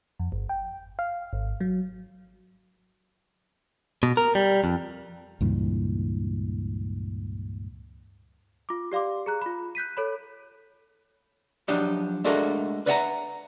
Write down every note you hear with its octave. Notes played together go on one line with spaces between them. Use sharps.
F2
G1
G5
F5
G#1
F#3
B2
A#4
G3
F2
C#2 G2 A#2 E3
F4 D6
G4 D5 F5 C6 D6
G#4 A#5 F#6
F4 B5
F#6 G6 B6 D#7
A4 C#5 B5
F3 F#3 D4 D#4 G4
G#3 A3 D4 F#4 A4 A#4
B4 D5 E5 F#5 G#5 A#5